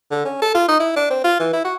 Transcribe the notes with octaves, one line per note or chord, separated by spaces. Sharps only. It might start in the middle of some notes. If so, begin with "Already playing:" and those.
D3
C#4
A4
F4
D#4
E4
D4
C4
F4
E3
E4
F#4